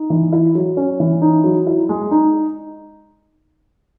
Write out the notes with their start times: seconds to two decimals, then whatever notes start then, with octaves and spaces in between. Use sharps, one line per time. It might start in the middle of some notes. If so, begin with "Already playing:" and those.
Already playing: D#4
0.10 E3
0.33 E4
0.55 F#3
0.77 C#4
1.00 E3
1.22 D#4
1.44 F#3
1.67 E4
1.89 G#3
2.11 D#4